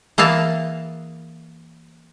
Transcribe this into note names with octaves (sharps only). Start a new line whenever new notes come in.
E3 A#3 G#4 F5 A5